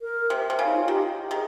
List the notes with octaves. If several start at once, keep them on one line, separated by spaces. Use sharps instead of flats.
A#4
C3
C3
C#3
D#4
F4
D#3 G4
D#3 G#4